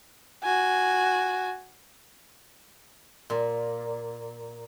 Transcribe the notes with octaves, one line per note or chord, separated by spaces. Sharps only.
F#4 G#5
A#2